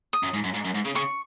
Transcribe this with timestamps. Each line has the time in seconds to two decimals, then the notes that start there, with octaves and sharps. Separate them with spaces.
0.13 D#6
0.23 F#2
0.34 G#2
0.44 F#2
0.54 G#2
0.65 F#2
0.75 G#2
0.85 C#3
0.95 C#3 C#6